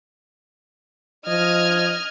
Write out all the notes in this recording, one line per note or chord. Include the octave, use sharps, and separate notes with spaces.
F3 D#5 F6 G#6